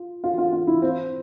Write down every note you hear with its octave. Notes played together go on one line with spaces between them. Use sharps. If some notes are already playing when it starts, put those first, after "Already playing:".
Already playing: F4
F4
F4
F4
E4
C4